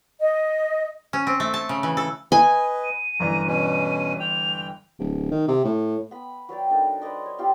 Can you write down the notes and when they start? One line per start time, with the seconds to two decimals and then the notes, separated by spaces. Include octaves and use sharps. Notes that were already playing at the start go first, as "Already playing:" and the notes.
0.20 D#5
1.13 C#4
1.27 C4
1.40 A3
1.54 A5
1.69 C#3
1.83 E3
1.97 A4
2.32 B4 D#5 G#5
2.83 D#7
3.20 G1 F#2 E3 A#5
3.46 B2 C#4
4.20 G5 F7
4.99 D1
5.31 D#3
5.48 C3
5.65 A2
6.11 B3 B5
6.49 F#3 B4 D5 G5
6.70 D4 D#4 A4 A#4
7.02 B4 C5 D5 D#5
7.26 C#5
7.39 C4 F4 G4